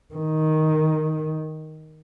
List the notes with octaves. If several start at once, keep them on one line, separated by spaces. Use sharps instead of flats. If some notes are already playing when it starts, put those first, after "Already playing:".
D#3